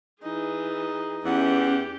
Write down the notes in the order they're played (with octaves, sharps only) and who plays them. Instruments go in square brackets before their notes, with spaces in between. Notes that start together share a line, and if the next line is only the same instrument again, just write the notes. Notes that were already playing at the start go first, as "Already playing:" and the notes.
[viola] E3 G#4 [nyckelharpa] D#4
[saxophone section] E2 E3 F#5 [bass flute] C#4 [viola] G4